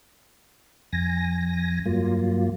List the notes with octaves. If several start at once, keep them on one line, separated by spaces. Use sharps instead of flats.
F2 G#5 A#6
G2 F#3 A#3 F4